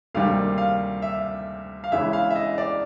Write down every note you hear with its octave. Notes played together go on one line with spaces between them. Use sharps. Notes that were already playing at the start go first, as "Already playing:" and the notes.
D2 C3 D#3 G3 A#3 F5
F5
E5
F5
E2 C#3 E3 G#3 E5
F5
E5
D#5
D5